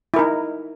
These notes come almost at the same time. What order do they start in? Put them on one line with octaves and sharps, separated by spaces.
E4 A#4 D#4